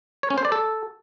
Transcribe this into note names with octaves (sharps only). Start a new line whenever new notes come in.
C#5
C#4
C5
D5
A4